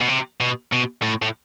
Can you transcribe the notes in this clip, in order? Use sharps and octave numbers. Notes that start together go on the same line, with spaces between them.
B2
C3
B2
B2
A2
A2